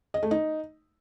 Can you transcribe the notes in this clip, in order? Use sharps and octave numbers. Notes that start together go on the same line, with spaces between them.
D#5
A3
D#4